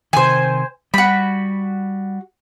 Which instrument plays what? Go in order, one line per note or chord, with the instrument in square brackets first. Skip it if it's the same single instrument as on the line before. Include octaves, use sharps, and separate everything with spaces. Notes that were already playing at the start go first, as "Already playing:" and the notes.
[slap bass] C3 D#3 [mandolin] C5 G#5
[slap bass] G3 [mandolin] F#4 B5